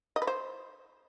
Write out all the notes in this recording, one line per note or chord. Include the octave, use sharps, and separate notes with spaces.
D#5
B4
C5